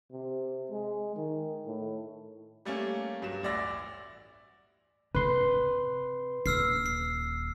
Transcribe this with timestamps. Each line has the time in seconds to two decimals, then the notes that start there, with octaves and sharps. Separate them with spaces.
0.12 C3
0.71 G#3
1.16 D#3
1.66 A2
2.65 G3 A3 A#3 C#4
3.22 G2 F#3 E7
3.43 A1 D2 D5 E5 E6 A#6
5.15 C3 B4 C6
6.46 D#1 E6 F6 C7
6.86 C7